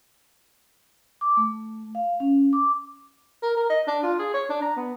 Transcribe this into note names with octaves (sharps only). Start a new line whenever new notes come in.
D6
A3
F5
C#4
D6
A#4
A#4
D#5
D4
F4
G#4
C#5
D4
A#5
B3